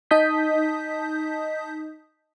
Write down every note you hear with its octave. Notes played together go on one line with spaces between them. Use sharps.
D#4 D#5 A5 D#6 G6 B6